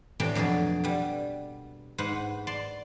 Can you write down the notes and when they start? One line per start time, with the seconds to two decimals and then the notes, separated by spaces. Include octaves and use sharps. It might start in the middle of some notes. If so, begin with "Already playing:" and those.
0.20 A2 C3 E3 D4 G4 G5
0.35 F2 B2 F#3 G#4 A4
0.84 B2 G3
1.98 G#2 B4 C5 F#5
2.47 D5 A5 C6